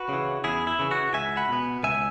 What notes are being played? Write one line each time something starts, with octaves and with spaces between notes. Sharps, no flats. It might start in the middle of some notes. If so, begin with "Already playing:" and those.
Already playing: F#4 B4
C#3 E3
E2 E4 G#4
E4
C#3 E3
F#4
C#2 E5 G#5
F#5 B5
B2 B3
C#2 E5 G#5